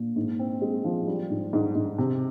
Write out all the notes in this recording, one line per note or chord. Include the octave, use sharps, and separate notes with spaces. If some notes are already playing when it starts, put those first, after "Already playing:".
Already playing: A#2
G#2
C4
G#3
F3
G3
G#2
G#2
G#2
C3